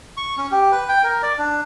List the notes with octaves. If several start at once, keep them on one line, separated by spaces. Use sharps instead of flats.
C#6
C#4
G4
B4
G5
A#4
D5
D4